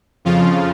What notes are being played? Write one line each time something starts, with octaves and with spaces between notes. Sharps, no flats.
F2 C#3 F3 F4